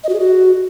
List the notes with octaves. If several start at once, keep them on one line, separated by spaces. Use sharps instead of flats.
D#5
F#4
G#4
F#4